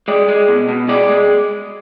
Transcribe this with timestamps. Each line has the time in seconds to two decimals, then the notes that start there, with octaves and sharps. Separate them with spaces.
0.08 G#3 D5
0.28 G#3
0.48 B2
0.69 B2
0.89 G#3 D5
1.09 G#3